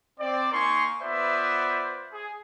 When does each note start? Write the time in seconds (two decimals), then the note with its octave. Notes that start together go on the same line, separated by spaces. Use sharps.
0.20 C4 D5
0.52 A#3 D#4 A#4 G#5 C6 C#6
1.02 B3 F4 B4 C5 D5 E5
2.13 G#4